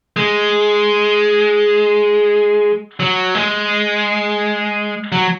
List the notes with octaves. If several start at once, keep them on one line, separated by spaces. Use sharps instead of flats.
G#3
F#3
G#3
F#3